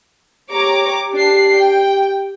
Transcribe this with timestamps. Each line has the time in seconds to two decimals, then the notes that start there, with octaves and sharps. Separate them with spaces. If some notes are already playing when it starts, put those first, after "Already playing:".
0.51 G4 C#5 A#5 D6
1.15 D4 C7
1.55 G5